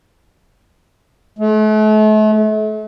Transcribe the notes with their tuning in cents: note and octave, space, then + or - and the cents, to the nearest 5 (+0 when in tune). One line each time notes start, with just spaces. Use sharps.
A3 -40